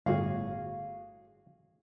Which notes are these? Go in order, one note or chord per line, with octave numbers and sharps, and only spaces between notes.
G1 A2 F#4 G#4 F5